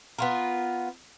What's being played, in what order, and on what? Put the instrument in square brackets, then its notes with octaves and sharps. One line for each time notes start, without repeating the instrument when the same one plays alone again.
[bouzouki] B3 F4 A#4